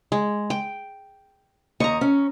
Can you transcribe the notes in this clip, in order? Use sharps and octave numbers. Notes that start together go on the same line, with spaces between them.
G#3
G5
D#2 D#5 A#5 C#6
C#4